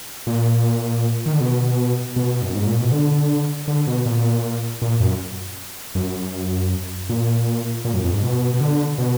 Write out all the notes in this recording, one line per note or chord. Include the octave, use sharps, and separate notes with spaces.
A#2
D#3
D3
B2
B2
F#2
G#2
A#2
B2
D3
D3
B2
A#2
A#2
F#2
F#2
A#2
A#2
F#2
F2
G#2
B2
B2
D3
B2